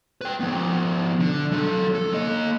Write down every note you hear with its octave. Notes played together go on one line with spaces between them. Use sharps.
B4 G5
F3 B3
D3
F#3 A4
A4
A#3 D#5